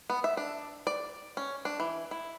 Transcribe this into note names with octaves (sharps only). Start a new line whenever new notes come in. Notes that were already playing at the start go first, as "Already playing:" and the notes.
B3
E5
D4
D5
C#4
D4
E3
E4